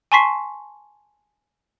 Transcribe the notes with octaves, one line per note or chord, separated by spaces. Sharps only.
G#5 A5 C6 C#6 B6 C7